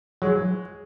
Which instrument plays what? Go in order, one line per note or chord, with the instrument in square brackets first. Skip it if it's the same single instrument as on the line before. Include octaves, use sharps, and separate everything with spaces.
[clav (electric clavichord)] F#3 [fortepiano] G#3